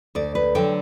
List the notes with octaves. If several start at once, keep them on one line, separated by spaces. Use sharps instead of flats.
D2 D5
B4
D3 F#3 G5